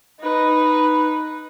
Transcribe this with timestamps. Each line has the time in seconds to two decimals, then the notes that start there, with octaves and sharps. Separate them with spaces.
0.20 D#4 B4